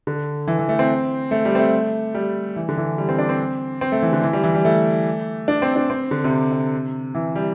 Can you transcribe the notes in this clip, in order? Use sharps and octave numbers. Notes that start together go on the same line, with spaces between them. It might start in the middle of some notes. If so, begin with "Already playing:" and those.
D3
E3
E3
A3
C4
A3
G3
C4
A3
G3
E3
D3
E3
G3
C4
D4
C4
C4
A3
E3
D3
E3
G3
E3
G3
A3
D4
C4
D4
C4
D3
C3
C3
E3
G3